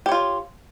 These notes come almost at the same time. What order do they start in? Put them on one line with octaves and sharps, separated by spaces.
G4 C#5 F4